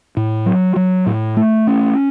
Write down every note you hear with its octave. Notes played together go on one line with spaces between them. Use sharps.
A2
F#3
F#3
A2
A3
C#4